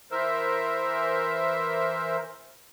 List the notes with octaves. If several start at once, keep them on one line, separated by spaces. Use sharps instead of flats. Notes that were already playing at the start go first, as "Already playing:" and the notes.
E3 A#4 C5 E5